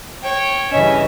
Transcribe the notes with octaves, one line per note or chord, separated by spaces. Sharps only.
C#5 G5
G2 C#3 E3 C#4 D#5 E5